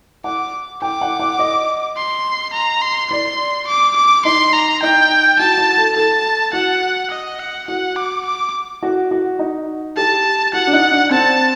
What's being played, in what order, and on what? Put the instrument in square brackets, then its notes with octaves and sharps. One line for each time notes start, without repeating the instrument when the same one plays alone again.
[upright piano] F#5 [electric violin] D6
[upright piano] G5 [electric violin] D6
[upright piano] F#5
F#5
D#5
[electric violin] C6
A#5
C6
[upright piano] D5 [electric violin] C6
[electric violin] D6
D6
[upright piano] D#4 [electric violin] C6
[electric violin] A#5
[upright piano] D#4 [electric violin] G5
[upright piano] F#4 [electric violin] A5
[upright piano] F#4
A4
[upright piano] A4 [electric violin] A5
[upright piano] F#4 [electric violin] F#5
[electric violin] D#5
F#5
[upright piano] F#4 [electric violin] F#5
[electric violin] D6
D6
[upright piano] F#4
F#4
D#4
[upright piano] G4 [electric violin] A5
[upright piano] F#4 [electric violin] F#5
[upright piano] D4
D#4
D4
[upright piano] C4 [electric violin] A5